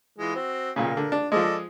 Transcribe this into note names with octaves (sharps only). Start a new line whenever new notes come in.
E3 G#3 F4
C4 F#4
B1 A#2 C#3 A#4
D3
D4
F3 G#3 A4 D5 D#5